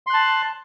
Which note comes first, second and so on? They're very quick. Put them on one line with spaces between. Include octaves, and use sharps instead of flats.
C6 F#6 A5